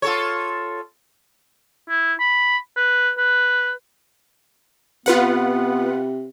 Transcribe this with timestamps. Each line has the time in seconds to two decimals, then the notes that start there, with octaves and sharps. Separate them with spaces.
0.02 F4 A4 C#5
1.89 E4
2.20 B5
2.77 B4
3.18 B4
5.06 C3 B3 F4 B4 F#5